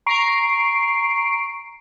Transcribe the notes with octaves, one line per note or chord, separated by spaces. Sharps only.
A#5 C#6 C7 D7